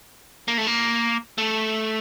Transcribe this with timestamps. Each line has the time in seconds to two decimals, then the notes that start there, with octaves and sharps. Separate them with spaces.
0.48 A#3
0.58 A3
0.67 A#3
1.38 A3